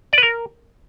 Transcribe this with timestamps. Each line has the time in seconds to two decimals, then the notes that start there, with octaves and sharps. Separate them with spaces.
0.13 D5
0.18 B4
0.23 A#4